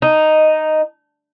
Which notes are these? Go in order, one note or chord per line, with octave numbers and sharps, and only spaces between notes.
D#4